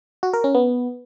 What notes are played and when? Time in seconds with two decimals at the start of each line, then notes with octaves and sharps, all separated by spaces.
0.23 F#4
0.33 A#4
0.44 C#4
0.55 B3